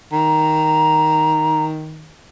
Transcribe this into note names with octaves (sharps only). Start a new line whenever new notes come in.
D#3 A#5